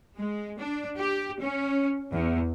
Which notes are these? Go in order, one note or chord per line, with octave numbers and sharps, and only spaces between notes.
G#3
D4
G4
C#4
E2